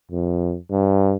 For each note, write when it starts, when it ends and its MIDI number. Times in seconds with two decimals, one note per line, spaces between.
0.12 0.56 41
0.71 1.17 43